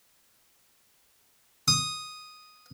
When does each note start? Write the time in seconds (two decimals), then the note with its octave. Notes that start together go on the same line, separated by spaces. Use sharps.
1.68 D#6